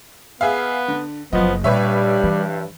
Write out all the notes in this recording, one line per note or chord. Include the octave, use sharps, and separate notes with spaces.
B3 G#4 E5 F5
D3
F#1 F3 F#3 B3 D#5
G2 A#2 C#3 G3 B4 C#5 E5
E3